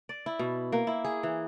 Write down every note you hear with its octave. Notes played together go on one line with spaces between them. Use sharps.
D5
E4
B2
A#3
E4
G#4
E3